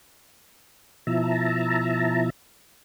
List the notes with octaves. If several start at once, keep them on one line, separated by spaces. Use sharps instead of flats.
B2 F3 E4 E5 A5 A#5